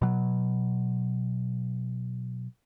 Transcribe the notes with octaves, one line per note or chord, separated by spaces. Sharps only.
B2 F#3